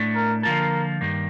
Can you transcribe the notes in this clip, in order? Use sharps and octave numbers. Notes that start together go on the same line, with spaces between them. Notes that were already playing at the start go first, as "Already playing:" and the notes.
Already playing: A2 A3 D4
A#4
D3 F3 A#3 F4 A4 A#4
G2 D#3 A#3